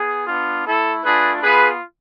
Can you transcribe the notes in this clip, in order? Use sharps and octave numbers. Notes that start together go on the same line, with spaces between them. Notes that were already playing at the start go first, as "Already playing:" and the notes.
Already playing: B3 G#4
B3 D4 F4
A3 E4 A4
A3 D4 F4 G#4 B4
B3 F4 G#4 B4